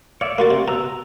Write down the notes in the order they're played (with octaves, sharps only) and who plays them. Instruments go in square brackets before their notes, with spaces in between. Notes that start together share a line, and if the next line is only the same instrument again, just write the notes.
[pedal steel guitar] C#5 D5 E5 [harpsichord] F5
[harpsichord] A#3 F#4 D5 [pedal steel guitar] A#4 C6 C#6
[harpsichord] C3
[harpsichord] B2 [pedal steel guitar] A#5 E6
[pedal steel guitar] A#5